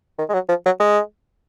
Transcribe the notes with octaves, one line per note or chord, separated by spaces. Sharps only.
D#3
G#3
F#3
F3
F#3
G#3